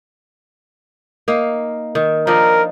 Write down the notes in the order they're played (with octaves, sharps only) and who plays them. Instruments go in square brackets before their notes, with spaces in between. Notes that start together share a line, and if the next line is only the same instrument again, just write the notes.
[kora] A#3 D#4 F5
D#3
[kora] F3 D4 D#4 [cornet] A#4